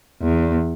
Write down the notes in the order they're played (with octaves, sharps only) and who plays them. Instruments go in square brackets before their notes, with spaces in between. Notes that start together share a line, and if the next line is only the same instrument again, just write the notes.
[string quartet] E2